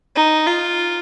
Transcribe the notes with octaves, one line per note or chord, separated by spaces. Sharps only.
D#4
F4